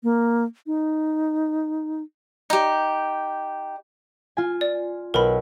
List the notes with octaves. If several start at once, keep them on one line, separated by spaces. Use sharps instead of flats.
A#3
D#4
D#4 G4
F4 G#5
D5
B1 A#4 B4 B5